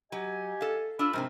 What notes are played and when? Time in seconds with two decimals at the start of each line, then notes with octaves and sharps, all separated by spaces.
0.12 F#3 G4 D#5 G#5
0.61 A4 F5
0.99 D4 F4 B5 E6
1.13 G#2 C3 F3 C4 A#4